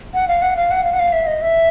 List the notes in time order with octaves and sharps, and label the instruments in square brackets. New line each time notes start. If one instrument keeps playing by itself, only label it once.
[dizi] F#5
F5
F#5
F5
F#5
F5
F#5
F5
E5
D#5
E5